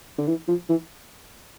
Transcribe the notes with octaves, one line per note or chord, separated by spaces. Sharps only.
D3
E3
F3
E3